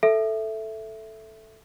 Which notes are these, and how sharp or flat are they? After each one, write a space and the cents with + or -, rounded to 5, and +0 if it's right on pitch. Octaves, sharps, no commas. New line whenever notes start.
A4 +0 E5 +0